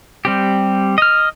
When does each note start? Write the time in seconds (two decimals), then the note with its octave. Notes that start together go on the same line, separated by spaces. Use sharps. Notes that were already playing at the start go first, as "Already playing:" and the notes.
0.25 G3 C4 G4
0.98 D#5 F6